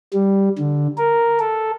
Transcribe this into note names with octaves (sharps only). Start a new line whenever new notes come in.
G3
D3
A#4
A4